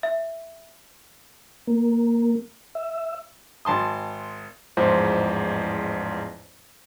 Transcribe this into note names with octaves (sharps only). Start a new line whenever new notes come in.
E5
A#3
E5
G#1 A5 C6 D#6
A1 E2 G#2 F3 C5